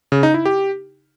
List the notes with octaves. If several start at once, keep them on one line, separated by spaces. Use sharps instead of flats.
C#3
D#4
E4
G4